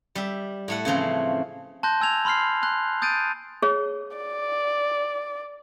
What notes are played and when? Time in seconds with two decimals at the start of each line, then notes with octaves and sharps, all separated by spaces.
0.15 G3 E5
0.68 A2 A3 F#5
0.85 C#3 E3 F3 C4
1.83 A5 C6 F#6 G6 A#6
2.01 G#5 E6 G#6 F7
2.25 B5 C6 F6 C7
2.62 G#5 C6 F#6
3.02 D#6 G6 A6 D7 D#7
3.63 G#4 C#5
4.17 D5